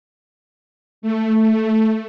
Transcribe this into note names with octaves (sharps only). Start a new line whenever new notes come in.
A3